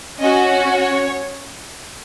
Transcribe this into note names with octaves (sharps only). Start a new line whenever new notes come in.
C#4 F#4 D#5
C#5